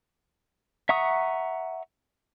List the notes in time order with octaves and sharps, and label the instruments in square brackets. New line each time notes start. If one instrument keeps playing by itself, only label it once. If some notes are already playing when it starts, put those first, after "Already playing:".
[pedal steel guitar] E5 F#5 A#5 C#6 D#6